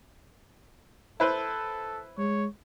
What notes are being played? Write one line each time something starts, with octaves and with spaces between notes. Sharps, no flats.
E4 A4 B4 C5
G#3 C#5